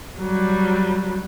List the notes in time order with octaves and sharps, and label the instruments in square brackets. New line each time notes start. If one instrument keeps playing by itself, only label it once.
[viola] F#3 G3